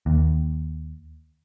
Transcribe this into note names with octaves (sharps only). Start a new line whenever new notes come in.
D#2